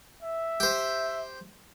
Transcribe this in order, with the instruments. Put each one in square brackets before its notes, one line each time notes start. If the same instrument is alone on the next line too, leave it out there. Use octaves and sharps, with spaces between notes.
[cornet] E5
[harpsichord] G4 C5